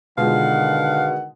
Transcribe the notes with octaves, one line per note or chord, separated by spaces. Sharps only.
B2 D3 D#3 G#3 F4 F5 F#5